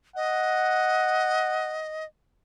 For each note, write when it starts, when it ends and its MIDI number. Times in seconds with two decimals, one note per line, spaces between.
0.16 2.05 75
0.16 1.85 78